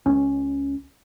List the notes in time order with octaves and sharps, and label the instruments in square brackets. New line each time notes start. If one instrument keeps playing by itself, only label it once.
[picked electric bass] C#2 C#4